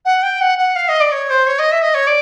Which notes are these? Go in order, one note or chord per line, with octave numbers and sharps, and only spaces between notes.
F#5
G5
F#5
F#5
F5
D#5
D5
C#5
C5
C#5
D#5
E5
D#5
C#5
D5